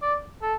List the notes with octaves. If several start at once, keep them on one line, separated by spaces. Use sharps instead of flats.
D5
A4